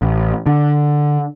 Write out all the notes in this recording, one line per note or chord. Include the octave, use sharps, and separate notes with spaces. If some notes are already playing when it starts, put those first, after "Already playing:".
A1
D3